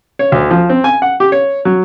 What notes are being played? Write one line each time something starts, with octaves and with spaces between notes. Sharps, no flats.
C#5
D2
F3
C4
G#5
F#5
G4
C#5
F#3